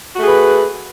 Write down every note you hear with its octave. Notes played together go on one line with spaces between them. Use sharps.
A3 F#4 G#4 B4